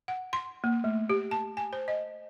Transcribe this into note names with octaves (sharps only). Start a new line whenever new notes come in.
F#5
C6
A#3
A3
G4
A5
G#5
C5
D#5